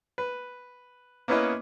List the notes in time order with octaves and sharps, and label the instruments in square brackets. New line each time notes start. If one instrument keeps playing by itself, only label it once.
[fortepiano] B4
A#3 B3 C#4 E4 B4 D#5